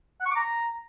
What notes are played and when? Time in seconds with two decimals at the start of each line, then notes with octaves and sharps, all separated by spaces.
0.20 F#5
0.25 C#6
0.30 D6
0.36 A#5